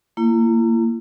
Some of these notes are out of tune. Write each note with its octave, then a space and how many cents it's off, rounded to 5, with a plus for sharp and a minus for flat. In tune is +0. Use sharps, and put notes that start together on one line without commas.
A#3 -20 E4 +40